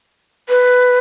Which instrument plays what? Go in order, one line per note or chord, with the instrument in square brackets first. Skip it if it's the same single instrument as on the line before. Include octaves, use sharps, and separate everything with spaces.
[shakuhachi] B4